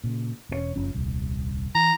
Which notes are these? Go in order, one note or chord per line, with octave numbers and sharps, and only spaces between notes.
A#2 C#3
E1 B2 C#4
F#1 F3 C#4
D#1 C2
E3 A#5